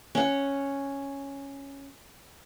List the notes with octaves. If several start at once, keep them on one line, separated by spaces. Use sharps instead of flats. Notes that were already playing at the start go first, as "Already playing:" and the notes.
C#4 F#5